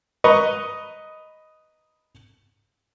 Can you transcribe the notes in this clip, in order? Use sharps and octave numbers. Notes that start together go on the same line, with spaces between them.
B4 D#5 A#5 C#6